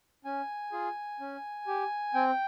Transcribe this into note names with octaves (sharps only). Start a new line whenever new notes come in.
C#4 G#5
F4 G#4
C#4
G4
C4 G5